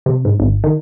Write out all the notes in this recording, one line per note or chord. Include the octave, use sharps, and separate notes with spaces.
C3
G#2
G#1
D#3